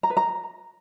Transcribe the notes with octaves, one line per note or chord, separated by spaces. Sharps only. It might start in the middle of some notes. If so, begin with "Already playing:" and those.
A#5
B4
A#5